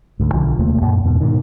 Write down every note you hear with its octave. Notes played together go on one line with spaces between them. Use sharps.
D2 G#2
B1 D3 F3
D#2 C3 A3 A#3
F#2 A#2
E2 G#2 B2
G#2 B2 D#3